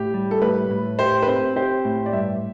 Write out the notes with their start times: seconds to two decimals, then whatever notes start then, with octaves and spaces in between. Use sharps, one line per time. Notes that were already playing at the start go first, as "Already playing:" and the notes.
Already playing: A2 G4
0.14 G3
0.31 A4
0.42 A2 B4
0.71 A2
0.99 G4 C5
1.22 B4
1.27 C4 C5
1.56 G4 C5
1.85 A2
2.06 D5
2.13 G2 E5